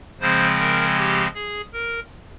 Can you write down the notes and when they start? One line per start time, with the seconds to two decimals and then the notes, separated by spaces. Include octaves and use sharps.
0.20 C#3 F3 G#3 C4 C5
0.59 A#4
0.98 G4
1.35 G#4
1.73 A#4